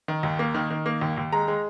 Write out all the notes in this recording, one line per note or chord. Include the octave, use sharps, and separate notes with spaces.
D#3
D#2
A#3
D#3
D#3
A#3
D#2
D#2
G#3 A#5
G#3